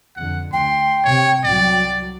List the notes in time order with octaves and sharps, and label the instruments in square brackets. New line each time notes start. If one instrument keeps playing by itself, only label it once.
[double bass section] F2 D3 [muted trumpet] F#5
[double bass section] D2 [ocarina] G5 [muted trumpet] C6
[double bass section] C3 [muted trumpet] C#5
[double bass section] C2 F#3 [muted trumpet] D5